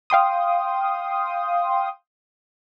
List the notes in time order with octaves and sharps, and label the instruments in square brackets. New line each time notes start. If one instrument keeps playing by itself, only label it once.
[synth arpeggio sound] F5 G5 C6 D#6